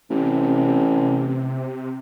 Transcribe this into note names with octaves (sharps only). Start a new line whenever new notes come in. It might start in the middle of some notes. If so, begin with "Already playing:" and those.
A1 C3